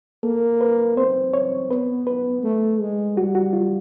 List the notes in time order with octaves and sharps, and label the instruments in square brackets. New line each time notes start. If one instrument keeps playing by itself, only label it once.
[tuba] A#3 [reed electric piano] A4
[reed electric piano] B4
[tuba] C4 [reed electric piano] C5
[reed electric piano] C#5
[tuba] B3 [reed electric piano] B4
[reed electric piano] B4
[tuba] A3
G#3
[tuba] G3 [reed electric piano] F#4
[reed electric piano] F#4
F4